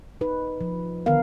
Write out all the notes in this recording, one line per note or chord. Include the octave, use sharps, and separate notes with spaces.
D#4 B4
F3
D3 D#3 B3 A#4 F5